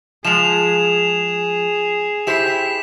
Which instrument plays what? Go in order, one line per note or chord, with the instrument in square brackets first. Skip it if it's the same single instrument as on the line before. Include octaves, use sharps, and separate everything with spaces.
[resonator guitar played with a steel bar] F3 G#3 [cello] G#4 [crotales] E7 F7
[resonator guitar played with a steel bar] E4 G4 C5 [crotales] B6 E7